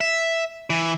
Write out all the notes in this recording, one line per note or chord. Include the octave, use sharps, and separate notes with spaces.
E5
E3